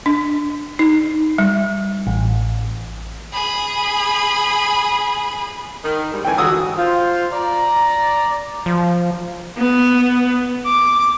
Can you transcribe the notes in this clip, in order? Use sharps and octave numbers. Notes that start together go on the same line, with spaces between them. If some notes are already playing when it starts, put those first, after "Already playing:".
D4
D#4
G3
A1
G#4 B5
D#3
G#2 G3
D3 E3 A3 G5 G#5
G#2 D3 G3 F#4 D#6 E6
F4 C5
D5 A#5
F3
B3
D6